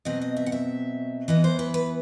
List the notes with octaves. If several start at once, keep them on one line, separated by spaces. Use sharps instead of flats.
B2 F#3 C4 D#5
D#5
E5
F#5
E5
E3 B3 D#5
C5
B4
B4